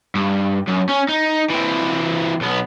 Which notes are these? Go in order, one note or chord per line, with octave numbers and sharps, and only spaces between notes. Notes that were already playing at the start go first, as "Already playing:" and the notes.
G2
F#2
C#4
D#4
E3 C4
B1 B3